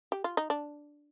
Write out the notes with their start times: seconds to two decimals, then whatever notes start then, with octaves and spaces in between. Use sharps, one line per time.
0.12 G4
0.24 F4
0.37 D#4
0.50 D4